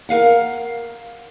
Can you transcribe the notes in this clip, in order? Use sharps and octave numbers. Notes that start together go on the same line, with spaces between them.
A#4 B4 F5 F#5